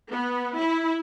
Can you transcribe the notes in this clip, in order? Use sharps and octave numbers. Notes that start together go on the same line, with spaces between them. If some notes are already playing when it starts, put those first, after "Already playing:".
B3
E4